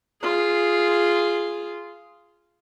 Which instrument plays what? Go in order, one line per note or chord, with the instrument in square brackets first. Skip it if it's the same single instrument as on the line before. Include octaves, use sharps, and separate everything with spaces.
[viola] F4 G#4